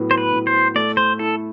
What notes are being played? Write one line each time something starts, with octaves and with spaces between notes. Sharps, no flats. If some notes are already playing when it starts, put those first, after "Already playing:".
Already playing: A2 F#3 B3
C5
B4
A2
C5
A3 D5
C5
E4 A4